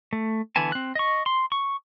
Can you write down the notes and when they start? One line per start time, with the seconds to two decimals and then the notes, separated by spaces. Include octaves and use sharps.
0.13 A3
0.56 D3 E3 B3 G#5 A5
0.72 C4 F#6
0.95 D#5 C#6
1.26 C6
1.52 C#6